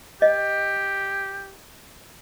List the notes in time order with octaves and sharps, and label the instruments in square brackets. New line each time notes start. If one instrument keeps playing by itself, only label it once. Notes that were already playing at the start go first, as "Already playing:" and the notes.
[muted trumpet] G4 [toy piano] D#5